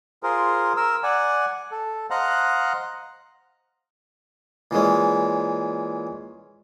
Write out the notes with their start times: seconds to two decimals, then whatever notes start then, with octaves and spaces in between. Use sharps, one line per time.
0.23 F4 G#4 A#4 C5
0.77 A#4 E6
1.03 D5 F#5 G#5
1.71 A4
2.10 C5 D#5 F5 F#5 A#5 F#6
4.71 A#2 E3 G#3 C#4